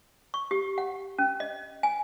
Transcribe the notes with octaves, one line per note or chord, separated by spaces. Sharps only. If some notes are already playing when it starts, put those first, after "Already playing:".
C#6
G4
F#5
C#4
D#5
G#5